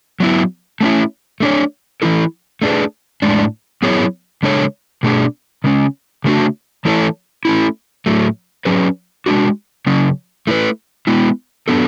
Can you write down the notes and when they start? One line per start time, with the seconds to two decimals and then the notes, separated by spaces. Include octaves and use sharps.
0.20 F#3 B3 E4
0.81 A3 C#4 E4
1.40 A3 D4 A4 C#5
2.02 E3 A3 E4 A4
2.62 A3 D4 G#4 B4
3.22 A2 G#3 D4
3.82 F#3 B3 E4 G#4 C#5
4.43 C#3 G#3 D4 A4 C#5
5.03 B2 A3 D4 G#4
5.64 C#3 G#3 C#4
6.24 C#3 F#3 A3 D4 F#4
6.85 E3 A3 E4 A4 C#5
7.45 A3 C#4 E4
8.06 A2 F#3 A3
8.65 F#3 C#4 G#4 B4
9.26 G#3 D4 F#4
9.87 C#3 F#3 C#4
10.47 A3 E4 B4
11.07 G#3 B3 E4
11.68 F#3 B3 D4 A4